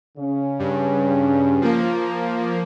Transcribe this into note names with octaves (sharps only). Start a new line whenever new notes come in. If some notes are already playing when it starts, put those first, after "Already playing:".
C#3 C#4
G2
F3 A#3